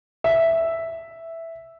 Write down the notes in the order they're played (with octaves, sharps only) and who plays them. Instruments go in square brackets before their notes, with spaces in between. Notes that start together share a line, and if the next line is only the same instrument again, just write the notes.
[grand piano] E5